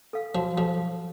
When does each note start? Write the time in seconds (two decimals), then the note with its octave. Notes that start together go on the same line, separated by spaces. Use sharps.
0.13 A4 F5
0.34 F3 F#4
0.57 F3 A4 F5